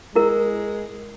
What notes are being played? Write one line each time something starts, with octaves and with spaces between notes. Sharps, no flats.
G#3 E4 A#4